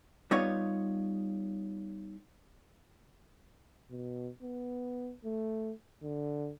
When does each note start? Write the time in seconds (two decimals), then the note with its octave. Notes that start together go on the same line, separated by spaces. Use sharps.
0.31 G3 B3 D#4 F4 C#5
3.91 B2
4.43 B3
5.25 A3
6.03 D3